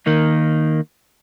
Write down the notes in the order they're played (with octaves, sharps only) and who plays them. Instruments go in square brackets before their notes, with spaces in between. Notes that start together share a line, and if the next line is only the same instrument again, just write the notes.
[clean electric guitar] D#3 A#3 D#4